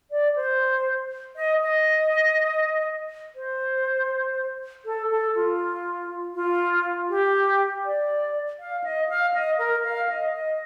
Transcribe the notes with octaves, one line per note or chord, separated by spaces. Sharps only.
D5
C5
D#5
D#5
C5
A4
A4
F4
F4
G4
D5
F5
D#5
F5
D#5
A#4
F5
D#5
D#5